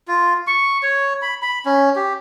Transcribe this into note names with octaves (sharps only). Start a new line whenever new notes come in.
F4
C#6
C#5
B5
B5
C#4
G4